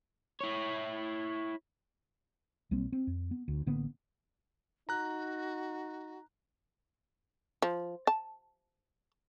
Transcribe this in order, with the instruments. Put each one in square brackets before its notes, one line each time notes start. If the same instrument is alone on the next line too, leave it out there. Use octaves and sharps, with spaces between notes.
[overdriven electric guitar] E4 C#5
[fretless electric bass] B1 G3 A#3 C4
C4
F2
B3
D2
A1 D3 A#3 B3
[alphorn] D#4 [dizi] F#4 [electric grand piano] A#5 F#6
[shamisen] F3
A5